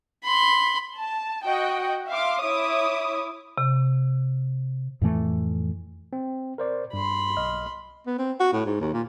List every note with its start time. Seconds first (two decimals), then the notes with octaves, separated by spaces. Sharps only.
0.24 B5 C6
0.98 A5
1.45 F#4 D#5 F#5 G5
2.08 E5 F5 C6 D6
2.44 E4 C#5 E5 D6 D#6
3.58 C3
5.02 F2 A2 E3 A3
6.13 C4
6.58 A#4 C5 D5
6.93 G2 B5 C6
7.37 B1 D#5 F6
8.07 B3
8.18 C4
8.40 F#4
8.53 A2
8.66 G#2
8.81 D#2
8.94 A#2